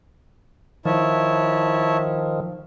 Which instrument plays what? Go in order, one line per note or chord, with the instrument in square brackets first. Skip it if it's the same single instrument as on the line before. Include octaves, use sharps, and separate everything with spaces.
[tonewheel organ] D#3 F3 [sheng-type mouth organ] E4 C#5 A5